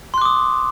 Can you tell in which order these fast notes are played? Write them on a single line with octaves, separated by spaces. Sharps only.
C6 F#6 D6 D#6